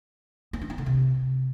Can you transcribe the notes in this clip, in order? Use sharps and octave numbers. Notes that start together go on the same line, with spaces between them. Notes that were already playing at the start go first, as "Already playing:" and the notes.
B3
D4
D#4
D3
C3